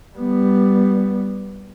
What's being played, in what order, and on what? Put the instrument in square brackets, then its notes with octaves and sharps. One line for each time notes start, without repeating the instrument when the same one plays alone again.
[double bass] G3 B3